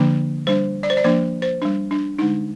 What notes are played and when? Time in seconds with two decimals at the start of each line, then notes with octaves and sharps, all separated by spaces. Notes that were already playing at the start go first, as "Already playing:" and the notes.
Already playing: D3 F3 A#3 D4
0.47 G3 D4 C5
0.83 D5
0.90 C5
0.97 D5
1.04 F3 A#3 D4 C5
1.42 C5
1.62 G3 D4
1.91 D4
2.19 D3 G#3 D4 D#4